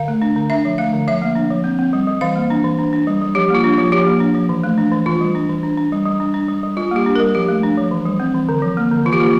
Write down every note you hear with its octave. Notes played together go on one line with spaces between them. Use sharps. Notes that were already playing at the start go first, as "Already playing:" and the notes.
Already playing: D3 F5
A3
D4
D3
D4 E5
F3
A3 F5
D3
F3 E5
A#3
D4
F3
C4
C4
G3
G3
E3 F5
A#3
D4
E3
D4
D4
G3
G3
F3 G4
A#3 F4
D4
F3 F4
F3 G4
A#3
D4
F3
E3
A3
D4
E3
E3 F4
G3
D4
E3
D4
D4
G3
G3
D4
D4
G3
G3
G3 F4
A#3 G4
D4
G3 A#4
F3 G4
A3
D4
F3
E3
G3
C4
E3
D3
F3
A#3
D3
E3 F4
G4
A#3 F4